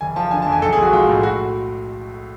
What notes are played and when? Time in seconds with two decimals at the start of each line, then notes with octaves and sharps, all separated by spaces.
0.01 F#1 G#5
0.16 F3 A5
0.31 D3 G#5
0.42 A5
0.46 F2
0.52 G#5
0.62 B1 A4
0.73 G#4
0.78 B1 F#4
0.93 G#3 F4
1.09 A2
1.23 F#4